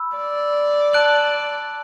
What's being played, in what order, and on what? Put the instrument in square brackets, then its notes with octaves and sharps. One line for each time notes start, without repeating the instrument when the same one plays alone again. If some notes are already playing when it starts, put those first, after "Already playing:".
Already playing: [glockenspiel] B5 E6
[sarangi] D5
[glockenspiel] A5 F#6 D7 F#7